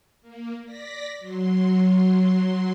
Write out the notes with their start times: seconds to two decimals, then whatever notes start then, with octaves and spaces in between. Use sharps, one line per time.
0.22 A#3
0.65 D5 A#6 B6
1.19 F#3 C6